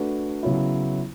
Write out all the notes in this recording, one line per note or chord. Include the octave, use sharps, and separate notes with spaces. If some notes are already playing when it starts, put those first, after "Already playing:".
Already playing: A3 D4 F#4 B4
C#3 F#3 B3 E4